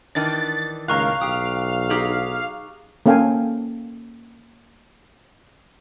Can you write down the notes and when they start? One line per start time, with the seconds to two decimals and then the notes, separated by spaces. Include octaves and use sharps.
0.15 D#3 E3 D4 A6
0.88 C#2 A2 D#3 A#3 F5 A#5 C#6 F#6
1.21 B1 G4 D#6 F7
1.90 D#4 G4 G#4
3.06 A#3 C#4 A4 F5 G5 G#5